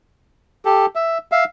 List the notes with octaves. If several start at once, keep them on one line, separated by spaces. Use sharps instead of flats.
G4 A4
E5
E5 F5